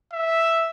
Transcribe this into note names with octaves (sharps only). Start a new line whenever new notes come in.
E5